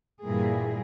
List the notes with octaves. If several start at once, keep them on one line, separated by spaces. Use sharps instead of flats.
G2 A#2 E3 G3 A#3 G#4